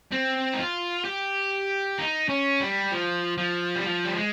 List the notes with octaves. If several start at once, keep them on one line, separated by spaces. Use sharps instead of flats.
C4
D#4
F4
G4
D#4
C#4
G3
F3
F3
G3
F3
G3
G#3